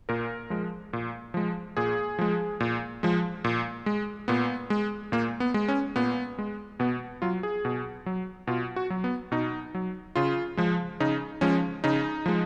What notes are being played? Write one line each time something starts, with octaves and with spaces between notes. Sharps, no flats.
A#2 A#4
F3 G#3
A#2
F3 G#3
A#2 G#4
F3 G#3
A#2
F3 G#3
A#2
G#3
A#2 B3
G#3
A#2 A#3
B3
G#3
C#4
A#2 B3
G#3
B2 B3
F#3 F4
G#4
B2
F#3
B2 F4
F#4
F#3
B3
B2 D#4
F#3
C#3 F4
F3 G#3
C#3 D#4
F3 G#3 C#4
C#3 D#4
F3 G#3